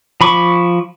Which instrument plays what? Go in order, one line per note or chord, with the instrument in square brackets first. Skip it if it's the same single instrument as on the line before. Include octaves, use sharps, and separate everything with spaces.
[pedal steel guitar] F3 B5 C#6 D6